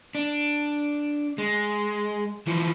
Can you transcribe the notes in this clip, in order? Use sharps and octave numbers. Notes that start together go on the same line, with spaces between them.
D4
G#3
E3 F3